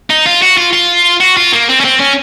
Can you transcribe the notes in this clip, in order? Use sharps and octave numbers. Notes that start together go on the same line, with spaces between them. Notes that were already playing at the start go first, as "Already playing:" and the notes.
D#4
F4
F#4
F4
F4
F#4
F4
A#3
C4
C#4
C4
C#4